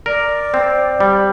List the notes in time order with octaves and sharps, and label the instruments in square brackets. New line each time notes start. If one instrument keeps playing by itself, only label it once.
[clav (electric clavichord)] A#4 [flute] D5
[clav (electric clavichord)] C4
G3